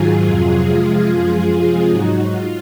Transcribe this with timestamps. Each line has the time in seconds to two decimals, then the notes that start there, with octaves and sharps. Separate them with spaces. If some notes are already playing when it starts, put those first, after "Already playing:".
Already playing: G#2 D#3 F#3 F4 G#4
0.24 F2 C3 F#3 F4 G#4
0.66 C3 F3 G#3
1.07 F#2 F3 G#3
1.49 C3 F3 G#3
1.90 G#2 F#3 D#4 F#4
2.31 F4